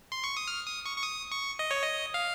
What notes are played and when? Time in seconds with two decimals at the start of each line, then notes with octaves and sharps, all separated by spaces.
0.12 C6
0.24 C#6
0.37 D#6
0.47 F6
0.67 D#6
0.86 C#6
0.98 C#6
1.03 D#6
1.32 C#6
1.59 D#5
1.71 C#5
1.83 D#5
2.14 F5